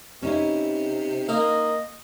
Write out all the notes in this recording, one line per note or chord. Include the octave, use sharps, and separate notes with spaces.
C3 C#4 D#4 E4
A#3 D#5